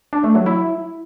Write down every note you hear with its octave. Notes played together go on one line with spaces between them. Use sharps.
D4
A3
F#3
E4